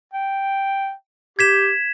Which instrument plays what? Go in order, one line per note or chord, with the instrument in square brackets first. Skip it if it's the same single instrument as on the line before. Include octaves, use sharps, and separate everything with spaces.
[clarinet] G5
[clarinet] G4 [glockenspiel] G#6 B6 E7